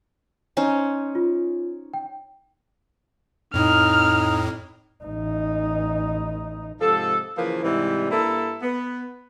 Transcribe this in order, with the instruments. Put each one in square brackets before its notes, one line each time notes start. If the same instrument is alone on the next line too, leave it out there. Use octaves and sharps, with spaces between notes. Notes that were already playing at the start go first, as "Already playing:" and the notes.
[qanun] C#4 D#4 C5
[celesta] F4
G5
[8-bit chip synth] F2 A2 [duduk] D#4 [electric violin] F6
[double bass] A1 D#4
[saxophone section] G#2 C3 F3 A4
C#3 E3 F3 A#3 B4 C5
G#2 C3 E3 G3 E4
G2 A#3 E4 A4
B3